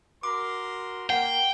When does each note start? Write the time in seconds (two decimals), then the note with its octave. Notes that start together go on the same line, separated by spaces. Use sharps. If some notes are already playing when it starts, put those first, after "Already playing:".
0.23 F#4 A#4 C6 D6
1.10 A#3 F#5 G5